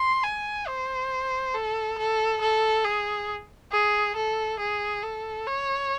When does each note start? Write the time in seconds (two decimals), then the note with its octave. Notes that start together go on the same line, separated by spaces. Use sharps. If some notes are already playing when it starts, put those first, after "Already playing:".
Already playing: C6
0.24 G#5
0.67 C5
1.54 A4
1.98 A4
2.42 A4
2.85 G#4
3.72 G#4
4.16 A4
4.59 G#4
5.03 A4
5.47 C#5